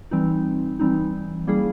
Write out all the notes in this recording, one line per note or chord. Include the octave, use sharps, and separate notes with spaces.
E3 G3 C4 D#4
E3 G3 C4 D#4
G3 A#3 C#4 E4 G#4